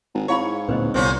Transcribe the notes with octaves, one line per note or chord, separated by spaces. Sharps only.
G#1
G#2 E4 C#5 F5 B5
D1 A#2 C4 B4 C5 D#5
G1 C2 A#2 C4 C#4